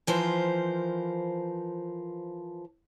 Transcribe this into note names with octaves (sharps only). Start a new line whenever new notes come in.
E3 F3 A#4 C5